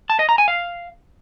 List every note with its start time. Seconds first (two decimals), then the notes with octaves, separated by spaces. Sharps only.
0.10 A5
0.19 D#5
0.29 A#5
0.38 G#5
0.48 F5